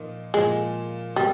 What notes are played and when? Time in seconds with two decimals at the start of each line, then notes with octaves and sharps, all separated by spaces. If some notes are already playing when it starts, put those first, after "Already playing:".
Already playing: A#2 F3 A#3 D#4
0.34 A#2 F3 G#3 A#3
1.16 B2 G3 G#3